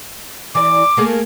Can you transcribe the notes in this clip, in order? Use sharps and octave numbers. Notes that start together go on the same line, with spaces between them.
E3 D5 D6
A3 A#3 G#4